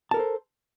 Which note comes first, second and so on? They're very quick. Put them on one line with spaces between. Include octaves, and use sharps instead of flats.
A5 A#4 A4 C5